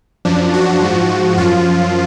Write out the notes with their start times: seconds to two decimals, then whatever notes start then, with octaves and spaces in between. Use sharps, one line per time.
0.25 F#2 F3 D4
0.54 F#4
0.82 G#2 F3
1.37 F#2 F3 F4